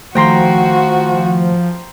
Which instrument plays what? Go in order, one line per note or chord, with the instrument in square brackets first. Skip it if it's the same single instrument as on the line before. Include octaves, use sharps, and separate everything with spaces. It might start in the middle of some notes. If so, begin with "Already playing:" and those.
[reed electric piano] D#3 A3 [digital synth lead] F3 [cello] F#4 [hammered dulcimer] G5 A#5 C6